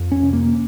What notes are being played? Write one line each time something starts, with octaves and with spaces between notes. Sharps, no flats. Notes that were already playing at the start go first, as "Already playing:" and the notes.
Already playing: F2
C#4
C3
A#3